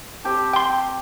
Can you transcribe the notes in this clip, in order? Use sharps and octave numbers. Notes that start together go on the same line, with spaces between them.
C4 G4 A5
G5 C6